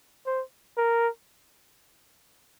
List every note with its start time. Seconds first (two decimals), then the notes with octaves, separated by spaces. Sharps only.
0.27 C5
0.77 A#4